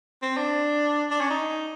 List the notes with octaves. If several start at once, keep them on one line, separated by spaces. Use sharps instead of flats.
C4
D4
D4
C#4
D#4